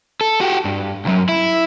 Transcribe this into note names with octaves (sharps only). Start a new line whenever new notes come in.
A4
F#4 G4
G2
C2 F#2
E4